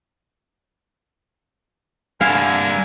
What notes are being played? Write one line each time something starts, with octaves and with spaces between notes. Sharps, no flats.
G2 D3 E4 A#4 F5 G#5